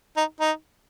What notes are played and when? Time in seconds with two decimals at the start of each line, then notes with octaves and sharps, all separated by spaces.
0.17 D#4
0.40 D#4